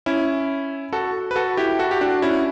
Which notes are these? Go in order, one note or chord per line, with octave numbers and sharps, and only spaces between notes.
C#4 E4
F#4 A4
B4
F#4 A4
E4 G4
F#4 A4
G4
D4 F#4
C#4 E4